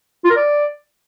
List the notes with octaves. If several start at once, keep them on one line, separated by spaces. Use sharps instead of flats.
F4
A#4
D5